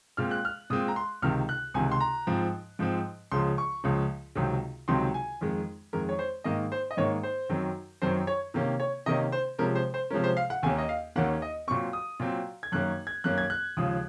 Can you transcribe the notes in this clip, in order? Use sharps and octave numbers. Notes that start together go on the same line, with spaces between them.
A#2 G#3 C4 F6
F#6
F6
A#2 G#3 C4 D#6
A#5
C6
C#2 C3 D#3 F6
F#6
C#2 C3 D#3 G#5
C6
A#5
G#2 F3 C4
G#2 F3 C4
C#2 C#3 F3 C6
C#6
C#2 C#3 F3
C#2 C3 D#3 F#3 C4
C#2 C3 D#3 F#3 C4 C6
G#5
F2 D#3 G#3
F2 D#3 G#3 A#4
C#5
C5
G#2 D#3 A#3 D#5
C5
D#5
G#2 D#3 A#3 C#5
C5
F#2 D#3 F#3 C4
F#2 D#3 F#3 C4 C5
C#5
C3 D#3 A#3 C#4
C#5
C3 D#3 A#3 C#4 D#5
C5
C3 F3 G#3 C#4 A#4
C5
C5
C3 F3 G#3 C#4 A#4
C5
F5
F#5
D#2 D#3 A#3 C#4 G#5
D#5
F5
D#2 D#3 A#3 C#4 F#5
D#5
A#2 F#3 C4 C#6
D#6
A#2 F#3 C4
G#6
F#2 D#3 A#3 C#4 F#6
G#6
F#2 D#3 A#3 C#4 F#6
G#6
F#6
D#2 C#3 F3 G#3 D#6